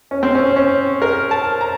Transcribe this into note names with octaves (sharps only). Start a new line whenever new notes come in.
C#4
C4
C#4
C#4
A#4
A5
A#5